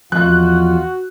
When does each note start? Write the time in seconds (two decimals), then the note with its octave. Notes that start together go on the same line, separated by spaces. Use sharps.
0.12 E2 F3 F4 F#4 D#5 B5 F#6